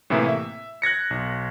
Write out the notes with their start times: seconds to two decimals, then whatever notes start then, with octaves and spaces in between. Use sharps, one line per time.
0.10 A2 C3 E3 A#3 E4
0.28 E5
0.82 F#6 G#6 A#6 C#7
1.11 B1